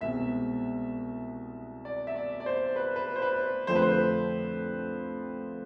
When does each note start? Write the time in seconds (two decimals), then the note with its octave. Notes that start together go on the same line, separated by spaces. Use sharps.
0.01 C2 B2 G#3 C4 E5
1.85 D5
2.07 E5
2.16 D5
2.40 D5
2.46 C5
2.76 B4
2.96 B4
3.16 C5
3.22 B4
3.67 F2 D3 F3 A3 C4 C5
3.75 B4
3.82 C5